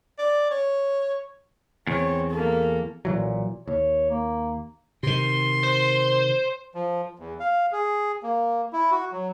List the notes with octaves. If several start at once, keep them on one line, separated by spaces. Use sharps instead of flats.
D5
C#5
E2 C4 C#5
A#3 A4
B1 A#2 E3 F#3
D#2 C#5
A#3
C3 D#3 C6
C5
F3
E2
F5
G#4
A#3
E4
F#4
F#3